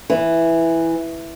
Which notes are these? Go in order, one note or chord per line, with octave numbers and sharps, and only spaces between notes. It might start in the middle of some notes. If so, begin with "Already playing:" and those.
E3